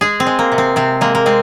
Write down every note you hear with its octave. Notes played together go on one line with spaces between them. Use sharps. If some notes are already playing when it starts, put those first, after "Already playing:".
G#3 G#4
C4
G#3
A#3
C3
C4
C3 C4
G#3 A#3
A#3
G#3 C4